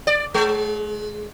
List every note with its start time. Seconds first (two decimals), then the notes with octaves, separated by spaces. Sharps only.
0.07 D5
0.34 G#3